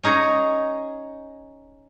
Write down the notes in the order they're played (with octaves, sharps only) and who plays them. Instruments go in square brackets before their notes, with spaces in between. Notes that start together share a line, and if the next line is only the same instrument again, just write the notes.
[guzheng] C#4 D#4 G#4 C#5 A#5